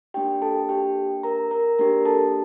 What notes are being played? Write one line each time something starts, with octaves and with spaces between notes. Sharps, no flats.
A#3 D4 G4 G5
A4 A5
G4 G5
A#4 A#5
A#4 A#5
A#3 D4 G4 A#4 A#5
A4 A5